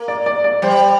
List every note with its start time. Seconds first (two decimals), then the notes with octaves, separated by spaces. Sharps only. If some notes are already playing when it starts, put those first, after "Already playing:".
Already playing: A#3
0.08 D5
0.26 D5
0.44 D5
0.62 G3 C5